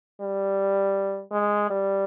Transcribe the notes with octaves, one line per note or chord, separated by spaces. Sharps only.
G3
G#3
G3